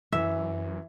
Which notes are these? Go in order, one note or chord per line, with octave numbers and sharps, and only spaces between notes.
F#2 E3 E5